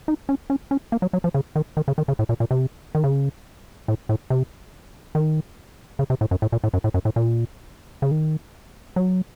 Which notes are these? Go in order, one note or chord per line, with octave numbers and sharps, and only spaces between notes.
D#4
C#4
C#4
C#4
A#3
F#3
F#3
F3
C#3
D#3
D#3
C#3
D#3
C#3
A2
A#2
A#2
C3
D#3
C#3
A2
A2
C3
D#3
C#3
C3
A2
F#2
A2
A#2
A2
F#2
A2
F#2
A2
A#2
C#3
D#3
F#3